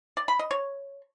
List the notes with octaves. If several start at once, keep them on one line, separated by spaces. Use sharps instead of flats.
D5
B5
D#5
C#5